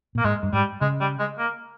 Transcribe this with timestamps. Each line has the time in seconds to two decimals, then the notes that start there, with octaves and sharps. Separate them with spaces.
0.15 A#2 A#3
0.24 G#2 G#3
0.43 G2
0.53 G#2 G3
0.81 C#3 G#3
1.00 G3
1.19 G#3
1.38 A#3